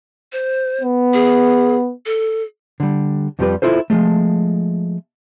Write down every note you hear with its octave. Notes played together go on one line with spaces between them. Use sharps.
C5
B3
G#4
A4
D3 G3
F2 F3 G3 D4 G4 B4
E4 F4 A4 C5
F3 G#3 A3